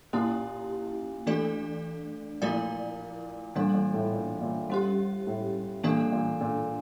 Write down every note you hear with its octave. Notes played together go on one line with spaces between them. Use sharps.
A#2 A#3 C#4 E4 G4
E3 A3 D4 A4 D5
A#2 F3 A3 E4 A#4 D5
A#2 E3 G3 D4 A4
A#2
A2
A#2
A#2
G3 C#4 G4
A2
A#2 E3 A#3 D4 A4
A#2
A#2